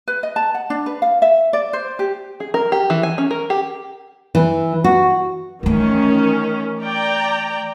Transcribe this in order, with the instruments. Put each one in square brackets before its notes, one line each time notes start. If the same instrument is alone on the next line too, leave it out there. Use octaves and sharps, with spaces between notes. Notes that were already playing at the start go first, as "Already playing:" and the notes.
[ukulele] B4
D#5
A5
F#5
D4
B4
F5
E5
D5
C5
G4
[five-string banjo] G#4
A#4
G4
E3
G#5
C#4
A#4
G4
[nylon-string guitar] E3
F#4
[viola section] D#3 C#4 [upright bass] E3 A3
[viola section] D5 G5 A#5